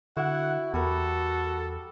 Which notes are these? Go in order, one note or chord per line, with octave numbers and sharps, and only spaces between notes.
D3 E4 F#4 F#5
E2 G3 F#4 A4 A#4